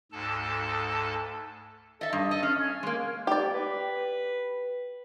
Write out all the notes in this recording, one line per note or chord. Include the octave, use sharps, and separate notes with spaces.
D2 G#2 A4 A5
A4 D#5 E5
G2 D#5
A4 D#5
C#4 F5
G#5
G#3 A#3
G4 D5
B4